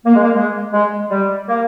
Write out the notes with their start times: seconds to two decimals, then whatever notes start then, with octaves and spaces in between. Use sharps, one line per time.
0.06 A#3
0.15 G#3
0.24 A#3
0.35 G#3
0.73 G#3
1.10 G3
1.47 A#3